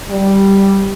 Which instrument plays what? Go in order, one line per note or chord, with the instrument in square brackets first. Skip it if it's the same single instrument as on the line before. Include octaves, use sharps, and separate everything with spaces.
[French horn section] G3